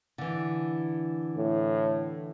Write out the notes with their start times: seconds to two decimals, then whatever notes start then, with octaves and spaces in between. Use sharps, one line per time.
0.18 D3 E3
1.36 A2